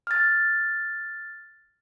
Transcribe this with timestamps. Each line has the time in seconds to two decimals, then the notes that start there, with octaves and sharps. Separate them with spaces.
0.07 F6 A6